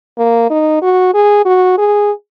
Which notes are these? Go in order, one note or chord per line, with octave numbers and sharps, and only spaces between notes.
A#3
D#4
F#4
G#4
F#4
G#4